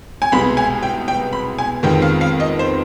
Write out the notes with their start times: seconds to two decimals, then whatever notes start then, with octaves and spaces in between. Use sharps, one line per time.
0.22 G#5
0.32 C2 B2 G#3 B3 B5
0.57 G#5
0.83 G5
1.08 G5
1.33 B5
1.58 G#5
1.83 F2 D#3 G#3 B3 G5
2.02 F5
2.21 F5
2.40 D#5
2.59 C5